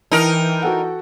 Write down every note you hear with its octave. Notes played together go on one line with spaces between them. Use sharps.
E3 D#4 A#4 G5 A5
F#4 A4 F#5